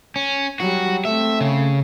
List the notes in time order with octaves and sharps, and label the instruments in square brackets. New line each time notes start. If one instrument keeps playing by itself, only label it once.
[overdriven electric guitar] C#4
[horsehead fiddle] F#3 G3 [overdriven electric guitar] F#4
[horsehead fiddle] A3 C4 [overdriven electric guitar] E5
[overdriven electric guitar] C#3